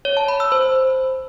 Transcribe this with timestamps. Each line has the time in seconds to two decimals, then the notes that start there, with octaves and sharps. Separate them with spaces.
0.05 C#5
0.17 A5
0.28 B5
0.40 E6
0.52 C5